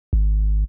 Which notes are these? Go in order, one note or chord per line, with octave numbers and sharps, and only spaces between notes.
G#1